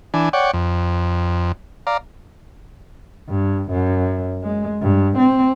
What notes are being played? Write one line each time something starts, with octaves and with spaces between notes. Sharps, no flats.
E3 D4 G#5
C#5 D5 F#5 G5
F2
D5 F5 A#5
G2
F#2
G#3
G2
C4